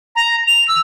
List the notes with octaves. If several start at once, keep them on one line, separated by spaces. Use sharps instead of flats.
A#5
F7
E6